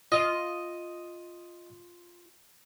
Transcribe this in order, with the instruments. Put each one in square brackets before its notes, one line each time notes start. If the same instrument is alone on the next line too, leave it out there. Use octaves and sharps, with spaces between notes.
[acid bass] F4 [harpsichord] D#5